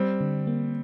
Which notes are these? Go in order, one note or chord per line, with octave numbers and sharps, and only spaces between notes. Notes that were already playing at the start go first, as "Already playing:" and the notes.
Already playing: G3 C4
D3
A#3